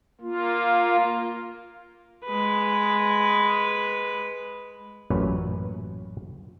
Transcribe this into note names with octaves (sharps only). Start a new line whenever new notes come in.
A#3 F4
G#3 B4
A1 F#2 A#2 B4 C#5